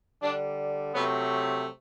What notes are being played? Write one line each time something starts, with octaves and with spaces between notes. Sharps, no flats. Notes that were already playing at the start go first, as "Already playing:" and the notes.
D3 G3 D4
C3 F#3 A3 B3